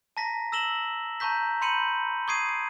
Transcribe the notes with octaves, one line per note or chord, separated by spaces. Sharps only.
A5 A#5 A#6 B6
E6 A#6 E7 F#7 G7
A5 A#5 C#6 G6 B6
B5 C6 G6 C#7 D#7 F#7
C#6 D#6 G#6 C7 D7 D#7
D7